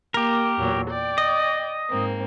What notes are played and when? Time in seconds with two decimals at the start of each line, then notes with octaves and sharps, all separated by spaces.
0.14 A#3 G4 A#4
0.58 E2 A#2 F#3
0.89 D5 G5
1.18 D#5
1.88 G#2 A#3 C4